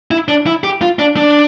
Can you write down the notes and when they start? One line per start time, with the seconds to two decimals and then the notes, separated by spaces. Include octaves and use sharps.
0.11 E4
0.28 D4
0.46 E4
0.64 G4
0.82 F4
0.99 D4
1.17 D4